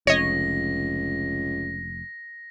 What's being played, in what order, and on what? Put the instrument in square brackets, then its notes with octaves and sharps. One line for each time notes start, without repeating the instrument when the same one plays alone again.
[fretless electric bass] F1 [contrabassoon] C#2 [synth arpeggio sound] C#5 D#5 [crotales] A#6